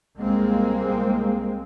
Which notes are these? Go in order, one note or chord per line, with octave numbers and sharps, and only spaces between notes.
C2 G#3 A#3 C4